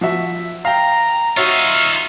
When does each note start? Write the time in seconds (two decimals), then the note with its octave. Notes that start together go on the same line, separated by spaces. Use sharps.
0.01 F3 F#4 E5
0.65 F5 G5 A#5
1.37 D#4 F4 F#4 C#5 E5 C#6 F6